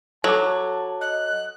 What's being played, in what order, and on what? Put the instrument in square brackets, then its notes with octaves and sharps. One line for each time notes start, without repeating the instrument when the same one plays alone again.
[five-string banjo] F#3 [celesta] A4 D6 [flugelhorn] A5
[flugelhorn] D#5 [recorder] F#6